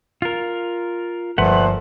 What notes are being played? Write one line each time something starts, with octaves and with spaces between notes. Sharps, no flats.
F4 A#4
G1 A#2 F3 A3 B4 C5 F#5